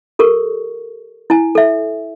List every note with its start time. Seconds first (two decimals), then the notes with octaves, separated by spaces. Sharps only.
0.19 G4 A4 A#4 C#6
1.30 E4 G#5
1.55 A4 E5